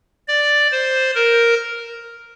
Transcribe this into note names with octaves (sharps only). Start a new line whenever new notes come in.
D5
C5
A#4